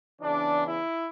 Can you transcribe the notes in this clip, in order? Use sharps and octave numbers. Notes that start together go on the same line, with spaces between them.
E2 C#3 E3 D4
E4